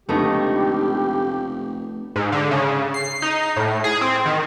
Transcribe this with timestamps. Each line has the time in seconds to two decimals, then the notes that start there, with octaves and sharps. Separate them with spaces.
0.09 F1 C#2 D3 A3 B3 D#4 G4 C#6
2.16 G#2
2.32 D3
2.51 C#3
2.94 C7
3.22 D#4
3.56 A2
3.84 G#4
4.01 C4
4.26 D#3